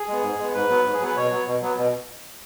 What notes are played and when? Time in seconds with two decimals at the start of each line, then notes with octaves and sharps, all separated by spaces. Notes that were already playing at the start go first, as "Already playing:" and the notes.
Already playing: G#4
0.08 G#3 B3
0.23 G#2
0.39 G#3 B3
0.54 G#2 B4
0.70 F#3 B3
0.85 G#2
0.94 G#4
1.01 F#3 B3 B4
1.17 B2 C#5
1.31 F#3 B3
1.47 B2
1.62 F#3 B3
1.78 B2